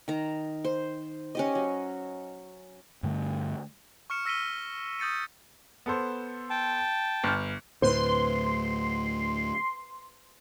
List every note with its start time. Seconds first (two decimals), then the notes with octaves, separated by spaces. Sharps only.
0.08 D#3 A#5
0.65 C5
1.35 C#4 G4 D#5
1.55 F#3
3.03 G2 D3 A3
4.10 C#6 F6 C#7 E7
4.25 E6 A#6 B6 D#7 G7
4.99 D#6 G6 A6 C#7 D#7
5.86 B3 A4 C5
6.50 G5 A5
7.24 G1 F6
7.82 D2 A2 B4 C5 C6